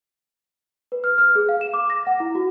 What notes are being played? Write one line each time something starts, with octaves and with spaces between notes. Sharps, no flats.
B4
F6
F6
G#4
F5
E7
D6
A#6
F#5
E4
F#4